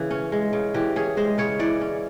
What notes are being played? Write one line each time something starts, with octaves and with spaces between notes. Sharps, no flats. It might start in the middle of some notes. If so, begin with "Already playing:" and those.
Already playing: C#3 E3
C#4
G#3
C#3
E3 G4
C#4 G#4
G#3 C5
C#3 C#5
E3 D5
C#4